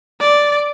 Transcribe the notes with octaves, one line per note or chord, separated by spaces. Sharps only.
D5